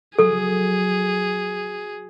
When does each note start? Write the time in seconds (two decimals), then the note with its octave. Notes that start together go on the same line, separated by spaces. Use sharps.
0.19 F#3 G#4 A4